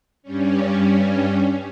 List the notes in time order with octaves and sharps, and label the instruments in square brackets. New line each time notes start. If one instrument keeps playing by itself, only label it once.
[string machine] G2 G3 C#4